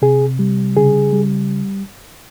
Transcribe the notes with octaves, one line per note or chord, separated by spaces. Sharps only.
C3 G#4
G3
C#3 G#4
G3